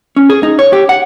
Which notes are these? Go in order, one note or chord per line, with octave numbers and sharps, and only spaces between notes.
C#4
G#4
D#4
C#5
G4
F#5